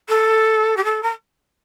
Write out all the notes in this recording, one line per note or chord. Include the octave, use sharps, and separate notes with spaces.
A4
G4
A4
A#4